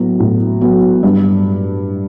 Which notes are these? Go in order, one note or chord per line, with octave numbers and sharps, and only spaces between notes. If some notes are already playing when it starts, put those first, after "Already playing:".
Already playing: A2 F#3 B3 F#4
A2
F#3 B3 F#4
G2